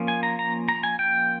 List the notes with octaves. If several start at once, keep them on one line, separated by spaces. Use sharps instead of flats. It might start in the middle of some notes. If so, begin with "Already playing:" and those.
Already playing: F3 A#3 C#4
G#5
A#5
A#5
A#5
G#5
G5